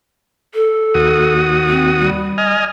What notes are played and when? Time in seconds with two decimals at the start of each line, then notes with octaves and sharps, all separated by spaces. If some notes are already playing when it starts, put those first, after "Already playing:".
0.55 A4
0.94 D#2 F#4 D#6
1.69 C4
1.99 G3
2.38 D#5 G#5 F6